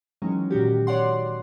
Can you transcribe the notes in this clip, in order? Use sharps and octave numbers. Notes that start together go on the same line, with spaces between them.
D#3 E3 F#3 G#3 C#4
A#2 D#3 F#4 G4
C#5 D5 F#5 C6